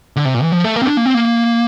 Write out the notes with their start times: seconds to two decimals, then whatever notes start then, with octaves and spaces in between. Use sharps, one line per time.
0.16 D3
0.25 C3
0.34 A#2
0.43 E3
0.52 F3
0.64 A3
0.76 A#3
0.82 C4
0.87 D4
0.97 A#3
1.06 C4
1.14 A#3